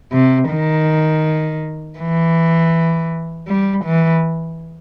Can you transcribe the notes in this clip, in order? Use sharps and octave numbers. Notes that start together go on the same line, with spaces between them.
C3
D#3
E3
G3
E3